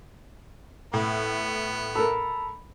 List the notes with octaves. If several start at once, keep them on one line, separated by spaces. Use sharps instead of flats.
A2 B3
A4 A#4 B5